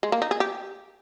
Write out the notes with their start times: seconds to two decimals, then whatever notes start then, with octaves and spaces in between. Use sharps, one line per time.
0.03 G#3
0.12 A#3
0.22 D#4
0.31 G#4
0.40 G4